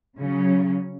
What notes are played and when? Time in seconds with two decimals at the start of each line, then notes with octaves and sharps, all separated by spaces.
0.18 C#3 F#3 C#4